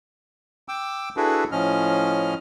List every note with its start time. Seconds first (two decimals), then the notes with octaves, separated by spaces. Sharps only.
0.68 G5 D6 E6
1.17 D4 E4 F#4 G#4 A4 B4
1.52 A2 F3 C#4 D#5 F6